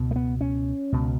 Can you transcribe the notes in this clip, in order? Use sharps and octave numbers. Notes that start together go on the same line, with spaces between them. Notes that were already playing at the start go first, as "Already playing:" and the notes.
Already playing: C#2 B2
A3
B3
C#4
C#2 B2